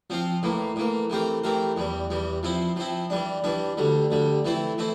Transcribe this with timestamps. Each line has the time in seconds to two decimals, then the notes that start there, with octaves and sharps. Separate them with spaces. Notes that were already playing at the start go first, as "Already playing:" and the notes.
0.10 F3 C4 F4
0.43 A2 E3 A#3
0.76 A2 E3 A#3
1.10 E3 A3 C4 G4 A#4
1.44 E3 A3 C4 G4 A#4
1.77 E2 E3 G3
2.10 E2 E3 G3
2.43 F3 C4 E4
2.76 F3 C4 E4
3.10 E3 G3 D4
3.44 E3 G3 D4
3.77 D2 D3 G3
4.11 D2 D3 G3
4.45 E3 A3 C4 E4 A4
4.78 E3 A3 C4 E4